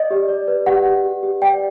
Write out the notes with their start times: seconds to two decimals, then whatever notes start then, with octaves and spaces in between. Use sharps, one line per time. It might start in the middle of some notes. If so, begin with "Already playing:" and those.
Already playing: D5 D#5
0.11 G4
0.28 D5
0.48 B4
0.66 G4 F#5
0.85 G4
1.04 G4
1.23 G4
1.42 D5 G5